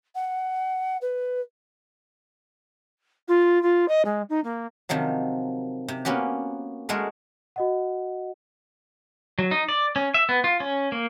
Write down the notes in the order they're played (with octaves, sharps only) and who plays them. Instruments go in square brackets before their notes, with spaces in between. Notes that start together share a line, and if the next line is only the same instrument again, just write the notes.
[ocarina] F#5
B4
[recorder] F4
F4
D#5
G#3
D#4
A#3
[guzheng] C3 D#3 F3 F#3
C3
A#3 B3 C#4 F#4 G4
G#3 A3 F#4 G#4 A#4
[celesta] F#4 D#5 F#5
[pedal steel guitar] F#3
D#4
D5
C#4
E5
B3
F4
C#4
A#3